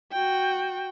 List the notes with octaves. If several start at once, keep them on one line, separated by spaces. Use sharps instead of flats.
F#4 G5